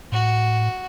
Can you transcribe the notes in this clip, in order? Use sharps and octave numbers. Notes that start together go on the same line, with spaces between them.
A2 F#4